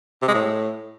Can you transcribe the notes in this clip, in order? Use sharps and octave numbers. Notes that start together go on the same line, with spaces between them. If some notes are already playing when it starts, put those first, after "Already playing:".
C3
G#3
A2